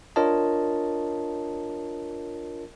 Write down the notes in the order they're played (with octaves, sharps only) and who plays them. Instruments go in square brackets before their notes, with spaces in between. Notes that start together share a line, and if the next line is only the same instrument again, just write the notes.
[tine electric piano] D4 F4 A#4 C#5 D#5 A5